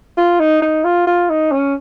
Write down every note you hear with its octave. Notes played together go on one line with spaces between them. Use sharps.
F4
D#4
D#4
F4
F4
D#4
C#4